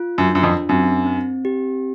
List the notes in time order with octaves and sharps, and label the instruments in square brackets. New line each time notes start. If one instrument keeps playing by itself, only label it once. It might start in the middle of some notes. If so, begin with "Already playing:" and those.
Already playing: [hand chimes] F4
[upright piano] F#2
[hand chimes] D4
[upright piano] F#2
F2
[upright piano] F#2 [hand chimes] C4
[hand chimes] C4
G4